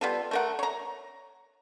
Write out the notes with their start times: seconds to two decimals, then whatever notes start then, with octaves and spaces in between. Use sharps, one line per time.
0.01 G3 B3 F4 A4
0.31 A3 A#4 F#5
0.59 C#5 A#5